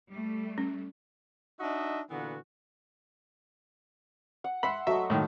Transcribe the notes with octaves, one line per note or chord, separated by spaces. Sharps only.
G3 A3
C#4
D4 D#4 F#4 D#5 E5
A#2 D3 E3 B3 F#4
F#5
E5 F#5 B5 C6
F#3 A3 D#5 E5
A2 D#3